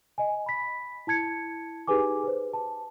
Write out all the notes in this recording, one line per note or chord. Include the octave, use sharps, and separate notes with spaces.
D#5 G#5
B5 B6
E4 A5 G#6 C#7
D#4 G4 G#4 B4 G#5 D6
B4 C5
A5